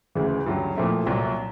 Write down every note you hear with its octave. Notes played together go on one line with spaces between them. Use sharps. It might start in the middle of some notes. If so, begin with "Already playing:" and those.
D2 C#3 E3 G#3
G2 D3 F#3
A#2 F3 A3 C4 E4
C2 A#2 F#3